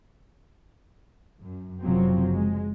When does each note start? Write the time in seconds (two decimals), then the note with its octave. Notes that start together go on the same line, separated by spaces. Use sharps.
1.42 F#2
1.81 F#1 C3 F3 F#3 C4
2.33 G#3